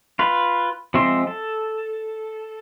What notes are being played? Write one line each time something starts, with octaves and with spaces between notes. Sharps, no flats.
F4 B4
F3 G#3 C4 E5 C6
A4